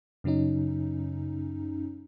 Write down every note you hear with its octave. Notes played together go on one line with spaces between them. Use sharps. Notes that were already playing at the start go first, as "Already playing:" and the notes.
F#2 C#3 F#3 C#4 D#4